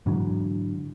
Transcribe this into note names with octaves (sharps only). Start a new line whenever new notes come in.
G#2 D3 E3 F#3